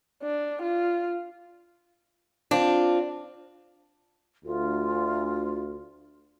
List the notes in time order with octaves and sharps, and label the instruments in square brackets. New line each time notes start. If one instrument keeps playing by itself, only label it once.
[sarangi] D4
F4
[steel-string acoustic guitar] C4 F4 [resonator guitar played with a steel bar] D4
[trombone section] D2 [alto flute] F4